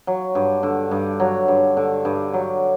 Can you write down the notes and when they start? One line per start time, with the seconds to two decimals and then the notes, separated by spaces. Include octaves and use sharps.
0.07 F#3
0.35 G2
0.63 D3
0.91 G2
1.20 F#3
1.48 G2
1.77 D3
2.05 G2
2.34 F#3